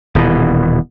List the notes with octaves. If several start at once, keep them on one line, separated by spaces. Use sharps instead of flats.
D#1 B2 E3